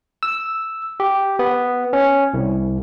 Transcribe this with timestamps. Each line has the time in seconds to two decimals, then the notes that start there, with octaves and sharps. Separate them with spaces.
0.23 E6
1.00 G4
1.39 B3
1.93 C#4
2.34 C2